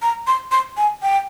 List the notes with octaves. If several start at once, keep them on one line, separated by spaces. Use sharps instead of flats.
A#5
C6
C6
G#5
G5